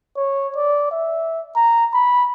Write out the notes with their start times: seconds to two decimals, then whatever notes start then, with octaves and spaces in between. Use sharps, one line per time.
0.17 C#5
0.56 D5
0.91 E5
1.56 A#5
1.94 B5